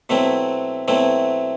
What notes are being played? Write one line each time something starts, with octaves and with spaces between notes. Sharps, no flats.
B2 F#3 A3 C4 E4
B2 F#3 A3 C4 E4